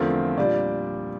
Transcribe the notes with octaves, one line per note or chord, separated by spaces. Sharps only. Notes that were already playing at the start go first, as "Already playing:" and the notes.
Already playing: E2 D3 F3 A3 C4 A#4
A#2 G3 D4 D5